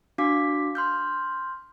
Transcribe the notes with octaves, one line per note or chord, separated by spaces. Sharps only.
D4 F#4 F5 D6 B6
C6 F6 G6